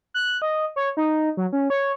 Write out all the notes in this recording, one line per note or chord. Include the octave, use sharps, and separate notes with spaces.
F#6
D#5
C#5
D#4
F#3
C#4
C#5